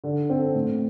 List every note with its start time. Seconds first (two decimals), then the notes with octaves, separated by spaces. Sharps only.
0.04 D3
0.30 C4 A4
0.55 A2